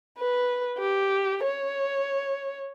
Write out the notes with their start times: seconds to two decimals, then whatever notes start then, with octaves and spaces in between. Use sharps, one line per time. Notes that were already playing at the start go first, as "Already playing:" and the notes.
0.19 B4
0.78 G4
1.44 C#5